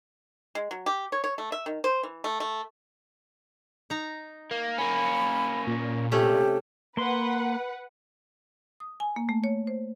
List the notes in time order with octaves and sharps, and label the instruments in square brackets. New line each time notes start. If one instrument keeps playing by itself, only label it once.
[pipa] G#3
F#3
G4
C#5
C#5
A3
E5
D#3
C5
E3
A3
A3
[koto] D#4 A#5
[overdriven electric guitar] A#3
[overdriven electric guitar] A#3 C#4 [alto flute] B5
[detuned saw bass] A#2
[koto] C3 A3 C#4 [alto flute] G4
[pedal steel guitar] A#3 C6 [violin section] B4 F#5
[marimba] D#6
G#5
A#3
A3
C#5
C5